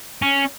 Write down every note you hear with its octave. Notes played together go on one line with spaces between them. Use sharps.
C#4